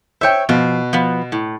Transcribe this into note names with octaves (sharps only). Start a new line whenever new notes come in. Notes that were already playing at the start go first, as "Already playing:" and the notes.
C5 C#5 E5 G5
B2 F3
F3 B3
A2